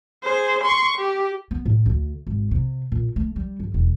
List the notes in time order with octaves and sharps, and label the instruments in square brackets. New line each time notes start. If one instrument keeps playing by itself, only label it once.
[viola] G#4 C5
C6 C#6
G4
[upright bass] B3
A2
D2
G#1
C3
A#2
A3
G3
G1
E1